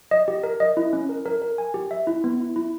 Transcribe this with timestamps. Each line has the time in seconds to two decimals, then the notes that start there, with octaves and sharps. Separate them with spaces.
0.11 D#5
0.28 G4
0.43 A#4
0.60 D#5
0.77 E4
0.93 C#4
1.09 A#4
1.26 A#4
1.42 A#4
1.58 G#5
1.74 G4
1.91 E5
2.07 E4
2.24 B3
2.40 E4
2.56 E4